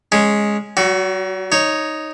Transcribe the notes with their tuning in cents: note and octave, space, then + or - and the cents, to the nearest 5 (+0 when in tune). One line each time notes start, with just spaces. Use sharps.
G#3 +0 C#4 +0
F#3 +45 F#4 +0
D#4 +0 C#5 +0